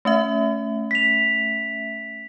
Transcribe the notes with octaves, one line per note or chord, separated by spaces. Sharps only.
A3 C#4 E5
B6 F7